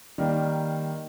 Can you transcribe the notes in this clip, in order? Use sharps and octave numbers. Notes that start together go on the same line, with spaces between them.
D#3 G3 A#3